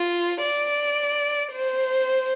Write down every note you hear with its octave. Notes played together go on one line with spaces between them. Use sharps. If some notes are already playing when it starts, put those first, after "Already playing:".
Already playing: F4
D5
C5